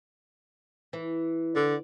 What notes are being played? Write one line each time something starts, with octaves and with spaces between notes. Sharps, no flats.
E3
D3 D5